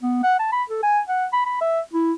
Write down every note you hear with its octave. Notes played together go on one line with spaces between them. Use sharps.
B3
F#5
A5
B5
A4
G#5
F#5
B5
B5
E5
E4